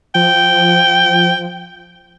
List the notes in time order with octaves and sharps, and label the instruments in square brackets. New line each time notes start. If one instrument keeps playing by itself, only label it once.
[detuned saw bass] F3 [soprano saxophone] G5